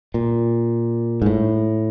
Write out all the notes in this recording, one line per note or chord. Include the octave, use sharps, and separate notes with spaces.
A#2
G#2
A2